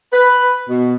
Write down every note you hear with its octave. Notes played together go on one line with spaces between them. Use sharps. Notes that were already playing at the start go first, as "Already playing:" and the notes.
B4
B2